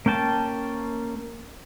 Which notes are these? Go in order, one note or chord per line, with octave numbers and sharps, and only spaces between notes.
A#3 C#4 G5 A5